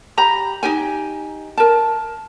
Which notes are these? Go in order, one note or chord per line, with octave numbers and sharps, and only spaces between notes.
G4 A#5 B5
D#4 G4 G5 G#5
A#4 A5